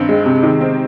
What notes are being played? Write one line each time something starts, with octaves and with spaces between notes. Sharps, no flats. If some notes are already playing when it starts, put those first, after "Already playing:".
Already playing: G2 D#3 C4
G#3
C3
D#3
C4